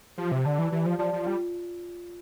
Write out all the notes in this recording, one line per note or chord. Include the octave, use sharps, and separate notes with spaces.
F3 G4
C3
D3 D5 A5
E3
E3 G4
F3
F3 D5 A5
F3
G3 F4